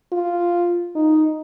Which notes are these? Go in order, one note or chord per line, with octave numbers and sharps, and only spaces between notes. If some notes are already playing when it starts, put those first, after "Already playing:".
F4
D#4